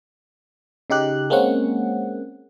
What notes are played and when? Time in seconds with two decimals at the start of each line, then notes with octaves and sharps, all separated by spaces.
0.90 C#3 D#4 G4 F#6
1.30 G#3 A#3 C4 C#4 F#5